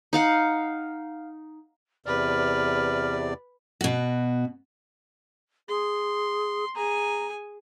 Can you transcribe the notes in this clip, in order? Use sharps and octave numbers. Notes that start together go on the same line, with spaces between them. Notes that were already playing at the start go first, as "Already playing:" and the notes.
D#4 F5 F#5
E2 C3 B4 D5 F6
B2 F#4
G#4 C6
G#4 G#5 A#5